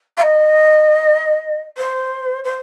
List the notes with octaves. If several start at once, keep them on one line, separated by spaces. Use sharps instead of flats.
F5
D#5
C5
C5